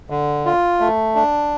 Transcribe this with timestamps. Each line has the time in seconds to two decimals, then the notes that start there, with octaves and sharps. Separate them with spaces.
0.10 D3
0.46 F4
0.80 A3
1.15 D4